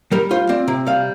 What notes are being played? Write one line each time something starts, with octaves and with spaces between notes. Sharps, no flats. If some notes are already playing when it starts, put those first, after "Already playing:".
G3 A#4
F4 C5
C4 D5
C3
G3 F5